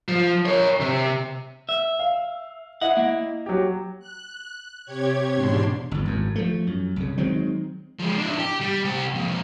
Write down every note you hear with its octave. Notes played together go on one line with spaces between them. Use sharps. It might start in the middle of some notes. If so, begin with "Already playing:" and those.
F3
A#4 C#5
C3
E5
F5
E4 D#5 E5 F#5
A#3
F#3 G4
F#6
C3 G4 C#5 G#6
E2 G#2 B2 D4 C6
G1 E2
G#1 F#2
F3 A3
F#2
C2 C#3
D#3 F#3 G#3 C4
F3 G#3
D4 E4
G4
G3
C2 G4
F2 A#2